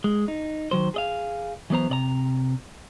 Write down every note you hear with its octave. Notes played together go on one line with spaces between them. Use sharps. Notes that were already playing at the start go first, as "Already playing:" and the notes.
G#3
D#4
D#3 F#3 C5
G#4 D#5 F5
E3 F#3 B3 C5 A#5
C3 D5 A#5